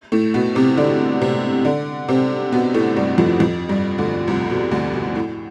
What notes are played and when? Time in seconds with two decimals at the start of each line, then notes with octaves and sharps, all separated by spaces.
0.12 A2 A3
0.34 B2 B3
0.55 C3 C4
0.77 D3 D4
1.22 C3 C4
1.65 D3 D4
2.09 C3 C4
2.52 B2 B3
2.74 A2 A3
2.96 G2 G3
3.18 F2 F3
3.40 F2 F3
3.69 G2 G3
3.98 D2 D3
4.28 C2 C3
4.50 B2
4.71 D2 D3
4.94 B2
5.15 A2